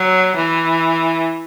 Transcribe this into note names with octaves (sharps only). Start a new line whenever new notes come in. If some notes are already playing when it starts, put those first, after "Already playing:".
Already playing: F#3
E3